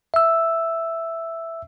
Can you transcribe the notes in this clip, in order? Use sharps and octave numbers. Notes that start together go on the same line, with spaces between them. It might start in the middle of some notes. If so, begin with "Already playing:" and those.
E5 E6